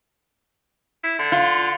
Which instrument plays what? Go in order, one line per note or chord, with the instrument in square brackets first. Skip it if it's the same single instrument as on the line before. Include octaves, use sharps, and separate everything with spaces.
[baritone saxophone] E4
D3
[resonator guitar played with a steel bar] F4